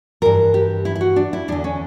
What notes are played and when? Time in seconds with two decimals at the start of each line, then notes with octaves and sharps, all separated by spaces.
0.22 G2 E3 A#4
0.54 G4
0.85 E4
0.95 E4
1.01 F#4
1.16 D4
1.33 E4
1.48 E2 D3 D4
1.64 C#4